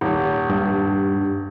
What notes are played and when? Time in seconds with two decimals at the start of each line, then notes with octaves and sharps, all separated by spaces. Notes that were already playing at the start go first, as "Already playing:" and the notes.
0.01 D#1
0.49 G2